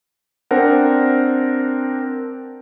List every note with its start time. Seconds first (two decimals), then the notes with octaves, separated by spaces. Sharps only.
0.51 C4 D4 A#4 C5 F#5